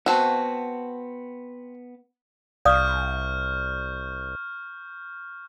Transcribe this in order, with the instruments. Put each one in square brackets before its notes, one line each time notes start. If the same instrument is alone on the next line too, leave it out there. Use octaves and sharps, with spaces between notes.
[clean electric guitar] B3 A5 [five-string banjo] C4 F#4
[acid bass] C2 [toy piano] D5 F5 D#6 [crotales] C#6 F6 G6